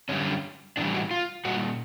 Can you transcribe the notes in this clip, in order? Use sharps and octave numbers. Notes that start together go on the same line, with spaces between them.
F#2 D3 G3 C#4
A2 E3 G3 D4
F#4
F4
A#2 G3 F#4